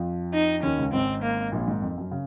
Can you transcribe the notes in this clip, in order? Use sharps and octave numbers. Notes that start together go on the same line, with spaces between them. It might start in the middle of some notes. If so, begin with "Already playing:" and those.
Already playing: F2 F3
D#4
D#2 D#3 C#4
C#2 C#3
G#1 G#2 C4
A#3
A#1 A#2
G#1 G#2
F2
F#2
C#3